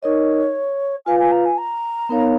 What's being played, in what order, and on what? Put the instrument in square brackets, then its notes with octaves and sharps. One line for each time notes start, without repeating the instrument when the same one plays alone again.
[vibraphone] D#4 A#4 D#5 [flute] C#5
[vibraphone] F4 B4 F5 [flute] G#5
[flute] G#5
A#5
G#5
A#5
[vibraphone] B3 D#4 A#4 C#5 F5